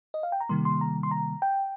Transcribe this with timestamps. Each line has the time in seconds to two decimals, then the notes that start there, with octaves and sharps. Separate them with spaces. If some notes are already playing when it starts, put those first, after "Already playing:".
0.14 D#5
0.23 F5
0.32 G5
0.40 A#5
0.49 C3 D#3 G3 A#3 C6
0.65 C6
0.81 A#5
1.03 C6
1.11 A#5
1.42 G5